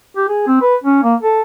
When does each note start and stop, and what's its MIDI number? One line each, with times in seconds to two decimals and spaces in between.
0.16 0.28 67
0.29 0.46 68
0.47 0.57 60
0.61 0.75 71
0.84 0.99 61
1.03 1.15 58
1.23 1.42 69